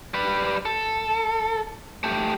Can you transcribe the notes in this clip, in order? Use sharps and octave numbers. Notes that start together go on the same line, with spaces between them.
G3 B4
A4
A3 G4